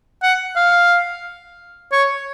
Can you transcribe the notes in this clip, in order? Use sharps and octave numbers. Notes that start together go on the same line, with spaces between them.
F#5
F5
C#5